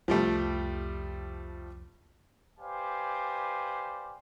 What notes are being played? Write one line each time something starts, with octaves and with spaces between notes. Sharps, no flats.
C2 F2 F3 G3 A3
G4 B4 C5 D5 F5 G#5